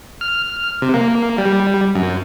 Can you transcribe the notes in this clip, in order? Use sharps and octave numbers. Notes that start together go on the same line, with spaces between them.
F6
C3
A#3
G3
F#2